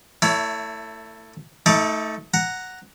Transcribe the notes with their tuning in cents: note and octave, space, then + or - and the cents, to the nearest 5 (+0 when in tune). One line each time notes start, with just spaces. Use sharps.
A3 +25 E4 +0 C#5 +45
A3 +0 D#4 +35 D5 +0
F#5 +0 A#5 +0